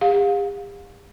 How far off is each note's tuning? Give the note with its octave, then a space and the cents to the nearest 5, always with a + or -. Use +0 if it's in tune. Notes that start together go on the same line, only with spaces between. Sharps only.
G4 +45 F5 +40